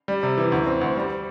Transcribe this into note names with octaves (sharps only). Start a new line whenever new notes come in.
G3
C3
E3
D2
C4
D2
G3